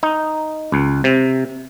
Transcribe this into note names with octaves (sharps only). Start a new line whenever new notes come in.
D#4
C#2
C3